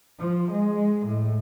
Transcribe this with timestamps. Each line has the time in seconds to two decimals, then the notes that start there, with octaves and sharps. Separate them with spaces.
0.20 F3
0.51 G#3
1.07 A2